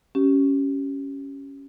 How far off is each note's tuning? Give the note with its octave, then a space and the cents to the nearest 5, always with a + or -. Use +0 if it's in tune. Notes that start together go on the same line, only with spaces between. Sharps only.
C#4 +0 G4 -25